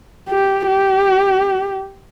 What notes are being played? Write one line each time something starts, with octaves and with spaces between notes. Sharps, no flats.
G4
G4